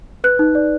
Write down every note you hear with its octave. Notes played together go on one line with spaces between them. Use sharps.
B4 F#6
D#4
D5